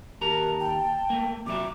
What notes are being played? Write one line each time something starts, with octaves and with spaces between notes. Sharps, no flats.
D#2 G4 A#4 A5 A#5
G5
A3 A#3
C3 F#3 E5 D6